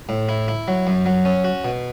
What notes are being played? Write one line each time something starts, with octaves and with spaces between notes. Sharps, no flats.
A2
E4
E4
F#3
F#2
F#3
C#4
F#4
B2